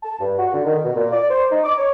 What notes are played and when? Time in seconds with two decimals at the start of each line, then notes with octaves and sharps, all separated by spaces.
0.03 A5
0.20 G2
0.39 F#4
0.53 D3
0.65 D#3
0.83 B2
0.96 A#2
1.12 D5
1.30 C5
1.51 D#4
1.64 D6
1.78 C#5